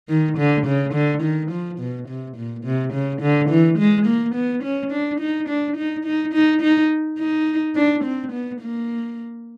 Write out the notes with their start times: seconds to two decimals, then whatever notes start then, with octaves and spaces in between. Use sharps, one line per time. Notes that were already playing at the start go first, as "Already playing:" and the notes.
0.09 D#3
0.38 D3
0.66 C#3
0.94 D3
1.23 D#3
1.51 F3
1.79 B2
2.08 C3
2.37 A#2
2.65 C3
2.93 C#3
3.21 D3
3.49 E3
3.78 G#3
4.06 A#3
4.35 B3
4.64 C#4
4.92 D4
5.20 D#4
5.49 D4
5.77 D#4
6.05 D#4
6.34 D#4
6.62 D#4
7.19 D#4
7.76 D4
8.04 C4
8.32 B3
8.61 A#3